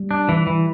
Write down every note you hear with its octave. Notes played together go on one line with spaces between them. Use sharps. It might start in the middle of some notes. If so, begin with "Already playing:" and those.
Already playing: G3
D4
E3 E4
E3